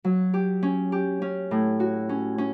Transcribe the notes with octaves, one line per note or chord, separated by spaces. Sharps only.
F#3
G4
C#4
G4
C#4
A2
F#4
C#4
C#4